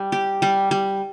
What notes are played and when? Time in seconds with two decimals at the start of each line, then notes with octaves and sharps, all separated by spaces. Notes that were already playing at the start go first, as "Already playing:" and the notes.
Already playing: G3
0.12 G4
0.42 G3
0.71 G3